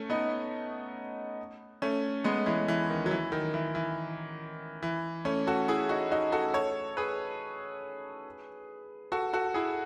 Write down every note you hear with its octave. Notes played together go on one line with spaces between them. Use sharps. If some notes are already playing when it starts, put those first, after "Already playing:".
Already playing: A3 C#4
B3 D#4
A3 C#4
G#3 B3
E3 G#3
E3
D#3
F#3
E3
D#3
E3
E3
E3
A3 C#4
F#4 A4
E4 G#4
D#4 F#4
D#4 F#4
F#4 A4
A4 C#5
G#4 B4
F#4 A4
F#4 A4
E4 G#4